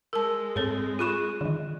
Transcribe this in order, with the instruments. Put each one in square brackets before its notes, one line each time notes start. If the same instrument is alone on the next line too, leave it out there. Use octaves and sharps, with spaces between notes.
[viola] G#3 [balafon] A#4 A5 [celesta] E6
[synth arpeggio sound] G#2 [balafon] C4 A4 C#5
[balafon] F4 B5 C#6 [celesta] G#4 F#6 E7
[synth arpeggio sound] D3 D#3